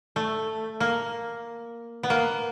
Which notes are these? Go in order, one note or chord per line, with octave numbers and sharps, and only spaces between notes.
A3
A#3
B3
A#3